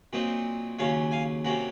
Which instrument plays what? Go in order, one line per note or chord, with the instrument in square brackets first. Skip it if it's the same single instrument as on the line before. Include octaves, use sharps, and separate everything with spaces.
[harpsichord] A#2 F#3 C4 D#4
D#2 C#3 F#3 C#5 F5
F5 G#5
C3 F#3 A#3 C#4 F#5 A#5